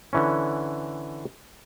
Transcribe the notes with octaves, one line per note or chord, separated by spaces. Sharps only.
D3 E3 C#4